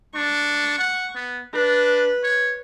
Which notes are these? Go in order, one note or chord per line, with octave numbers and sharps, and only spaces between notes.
D4 C#6
F#5
B3
D4 B4
C#5